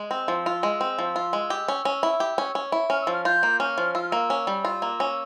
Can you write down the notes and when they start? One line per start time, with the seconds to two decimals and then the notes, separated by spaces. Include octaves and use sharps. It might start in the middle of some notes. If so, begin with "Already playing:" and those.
Already playing: G#3
0.11 C4 E6
0.28 F3
0.46 F4
0.63 G#3
0.81 C4
0.99 F3
1.16 F4
1.33 G#3
1.50 G4
1.68 C#4
1.85 C#4
2.03 E4
2.20 G4
2.38 C#4
2.55 C#4
2.72 E4
2.90 C#4 F6
3.01 E6
3.07 F3
3.13 F6
3.25 F4 G6
3.43 A#3
3.60 C#4 F6
3.78 F3
3.95 F4 E6
4.02 F6
4.09 A#3 E6
4.30 C#4
4.47 G3
4.65 F4
4.82 A#3
5.00 C#4